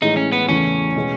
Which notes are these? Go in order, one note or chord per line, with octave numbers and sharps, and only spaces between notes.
A2 E3 G#3 D#4
C#4
B3
E2 C#3 E3 A3 C#4 E4
B2 G#3 B3